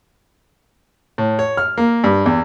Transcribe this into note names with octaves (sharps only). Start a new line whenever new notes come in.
A2
C#5
F6
A#3
G2
E2